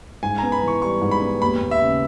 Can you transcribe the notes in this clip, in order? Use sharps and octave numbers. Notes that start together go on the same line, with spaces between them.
G#2 G#5
B3 A#5
B5
E3 C#6
G3 C#6
G#2
B5
B3
D#2 B5
D#2
E5
C#3